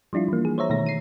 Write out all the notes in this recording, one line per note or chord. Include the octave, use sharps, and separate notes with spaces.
F3 G3 D4 E4 F4
E3 A#3
G#4
C5 C#5 E5 A#5
B2 D#3 A3 A#6
C7 D#7